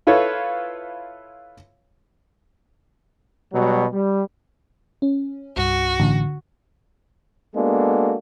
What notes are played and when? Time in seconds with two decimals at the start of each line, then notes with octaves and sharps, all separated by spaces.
0.07 E4 F4 A4 B4 C#5
3.53 B2 F#3 G3
3.92 G3
5.02 C#4
5.57 C2 G2 F#4
6.00 A1 D3
7.54 G#3 A#3 B3 D4 F#4 A4